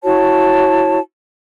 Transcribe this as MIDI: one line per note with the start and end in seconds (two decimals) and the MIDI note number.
0.04 0.99 64
0.04 0.99 66
0.04 0.99 73
0.04 0.99 81